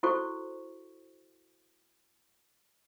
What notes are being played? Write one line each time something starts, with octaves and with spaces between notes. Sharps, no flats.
E4 F#4 A4 C5 C#6